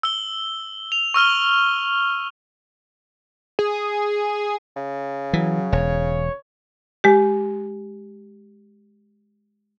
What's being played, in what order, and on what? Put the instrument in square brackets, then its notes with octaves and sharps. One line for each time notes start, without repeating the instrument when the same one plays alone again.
[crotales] E6 G7
F7
C#6 E6 F6 G7
[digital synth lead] G#4
[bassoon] C#3
[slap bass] E3 [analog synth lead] F#3
[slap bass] E1 [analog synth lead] C#5
[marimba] G#3 G4